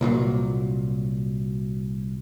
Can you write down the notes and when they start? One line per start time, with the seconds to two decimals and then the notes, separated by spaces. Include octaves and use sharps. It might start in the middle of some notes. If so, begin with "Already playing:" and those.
0.01 C2 A#2 F3 F#3